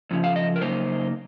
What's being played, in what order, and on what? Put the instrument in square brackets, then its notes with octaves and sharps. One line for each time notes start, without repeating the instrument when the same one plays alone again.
[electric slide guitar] F2 C#3 F3
F5
D#5
A#4
C#3 F#3 A#3 D#4 C5